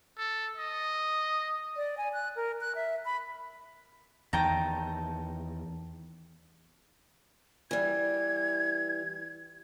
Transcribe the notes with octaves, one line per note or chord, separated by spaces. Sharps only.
A4
D#5
D5
G#5
F#6
A#4
F#6
E5
B5
E2 D#3 G5 A5 A#5
E3 G3 G#6